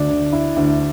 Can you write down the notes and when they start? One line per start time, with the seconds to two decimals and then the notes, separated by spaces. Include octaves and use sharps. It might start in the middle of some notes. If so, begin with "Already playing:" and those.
Already playing: D2 D4
0.10 D3
0.32 E4
0.56 D2